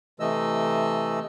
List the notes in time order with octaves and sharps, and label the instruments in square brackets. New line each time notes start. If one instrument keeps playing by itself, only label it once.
[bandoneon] C3 E3 A3 D#5 E6